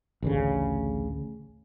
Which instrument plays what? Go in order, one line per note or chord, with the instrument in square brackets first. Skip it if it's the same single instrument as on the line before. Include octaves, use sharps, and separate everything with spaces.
[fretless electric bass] A1 D2 C#3